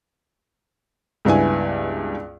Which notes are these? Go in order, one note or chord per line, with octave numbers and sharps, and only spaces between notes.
C#2 G2 B3 E4 G#5